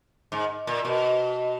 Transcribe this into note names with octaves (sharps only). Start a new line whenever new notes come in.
G#2
A#2
B2